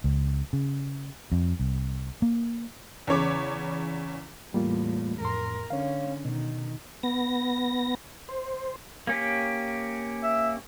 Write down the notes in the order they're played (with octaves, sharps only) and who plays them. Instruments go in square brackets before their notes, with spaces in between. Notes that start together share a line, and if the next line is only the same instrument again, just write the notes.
[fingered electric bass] C#2
C#3
F2
C2
A#3
[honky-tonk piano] E2 C#3 C#5 D6
[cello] E2 A2 [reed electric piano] G3 A#3 F4
[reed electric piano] F2 A2 C6 [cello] A#4
[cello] D3 C#4 [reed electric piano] C#5 F5
[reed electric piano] B2 [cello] D#3
[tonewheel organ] B3 A#6
C5
[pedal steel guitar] A#3 C#4 G4
[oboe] E5